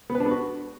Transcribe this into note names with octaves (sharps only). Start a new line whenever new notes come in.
B3
B4
D4
B3
F#4